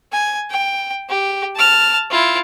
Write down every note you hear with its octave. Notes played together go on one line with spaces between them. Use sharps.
G#5
G5
G4
A5 F6
E4 F4